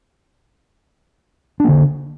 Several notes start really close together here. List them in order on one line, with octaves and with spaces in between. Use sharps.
D4 A#3 D3